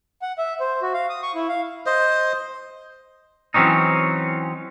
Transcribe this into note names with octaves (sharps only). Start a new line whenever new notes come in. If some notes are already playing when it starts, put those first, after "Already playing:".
F#5
E5
C5
F#4
F5
D#6
C#6
E4
F5
C5 D#5
E3 F#3 C4 C#4 D#4